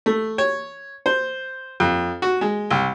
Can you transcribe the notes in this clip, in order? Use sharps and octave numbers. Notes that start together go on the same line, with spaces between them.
A3
C#5
C5
F2
F#4
G#3
C2